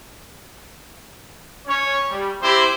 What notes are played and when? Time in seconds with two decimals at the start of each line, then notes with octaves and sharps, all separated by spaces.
1.67 C#4 C#5
2.10 G3
2.42 C4 E4 G4 C5